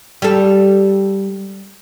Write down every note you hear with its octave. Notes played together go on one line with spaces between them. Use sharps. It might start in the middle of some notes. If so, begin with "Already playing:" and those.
G3 A4